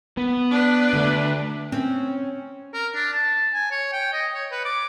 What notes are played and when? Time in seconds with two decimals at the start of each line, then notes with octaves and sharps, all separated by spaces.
0.17 B3
0.51 D4 B4
0.93 D3 A3
1.72 C4 C#4
2.74 A#4
2.95 D4
3.13 A5
3.54 G#5
3.72 C#5
3.93 G5
4.13 D#5
4.34 C#5
4.52 B4
4.65 D6